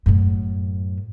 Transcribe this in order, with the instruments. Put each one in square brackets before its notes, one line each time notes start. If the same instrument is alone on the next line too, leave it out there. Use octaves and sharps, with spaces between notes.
[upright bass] F#2 A2